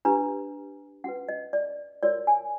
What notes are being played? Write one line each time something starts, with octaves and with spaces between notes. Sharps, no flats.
D4 G4 B4 A#5
C#4 F#4 B4 F#5
D#5
D5
F#4 A#4 C#5 D5
G#5